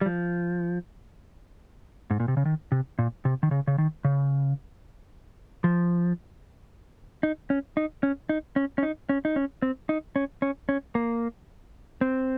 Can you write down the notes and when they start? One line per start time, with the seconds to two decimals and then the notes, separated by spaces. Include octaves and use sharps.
0.01 G3
0.06 F3
2.10 G#2
2.20 A#2
2.28 C3
2.37 C#3
2.45 D#3
2.72 C3
2.99 A#2
3.25 C3
3.43 D#3
3.51 C#3
3.67 C#3
3.78 D#3
4.05 C#3
5.64 F3
7.23 D#4
7.50 C#4
7.77 D#4
8.03 C#4
8.29 D#4
8.56 C#4
8.78 C#4
8.83 D#4
9.09 C#4
9.25 D#4
9.36 C#4
9.62 C4
9.89 D#4
10.16 C#4
10.42 C#4
10.69 C#4
10.95 A#3
12.01 C4